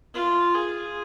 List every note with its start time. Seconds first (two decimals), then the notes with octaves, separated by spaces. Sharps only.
0.14 F4
0.54 G#4